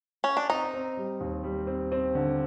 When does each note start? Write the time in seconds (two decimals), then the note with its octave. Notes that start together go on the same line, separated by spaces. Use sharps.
0.24 C#4
0.37 D4
0.49 C4 D#4
0.74 C4
0.97 G3
1.21 D#2
1.43 G3
1.67 C4
1.92 C4
2.15 D3